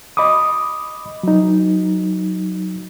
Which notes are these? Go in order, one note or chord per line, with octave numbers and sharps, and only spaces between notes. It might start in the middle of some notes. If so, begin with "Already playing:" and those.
D#5 B5 D6 D#6
F#3 D#4